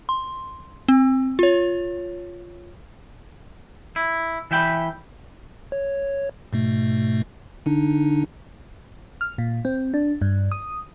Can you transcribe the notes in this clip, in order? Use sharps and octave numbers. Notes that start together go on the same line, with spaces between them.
C6
C4
F4 C#5
E4
E3 E5 G5 B5
C#5
G#2 B2 A3
D3 D4 D#4
F6
A#2
C4
D4
G2
D#6